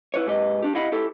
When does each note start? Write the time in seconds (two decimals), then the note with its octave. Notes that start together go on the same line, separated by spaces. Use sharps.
0.14 E4 B4 C#5
0.27 G#2 G4 B4 D#5
0.62 D4 G4
0.75 E4 G4 D#5 F5 F#5 B5
0.92 E4 G4 A4